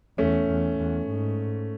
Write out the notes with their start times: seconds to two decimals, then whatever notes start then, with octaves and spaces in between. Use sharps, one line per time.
0.18 E2 A3 C#4
0.48 E2
0.78 E2
1.08 G#2